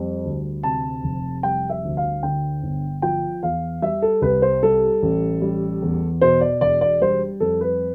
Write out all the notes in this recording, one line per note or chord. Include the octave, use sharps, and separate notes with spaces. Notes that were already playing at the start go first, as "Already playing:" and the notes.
Already playing: F2 G3
D2
C3 A5
F1
G3 G5
E5
D2
F5
D3 G5
G1
F3 G5
E2 F5
G3 E5
A4
C2 B4
C5
G3 A4
A1
G3
E2
B2 C5
D5
E1 D5
D5
G3 C5
F2 A4
B4